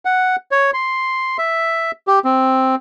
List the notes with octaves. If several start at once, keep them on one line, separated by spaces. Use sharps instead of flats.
F#5
C#5
C6
E5
G4
C4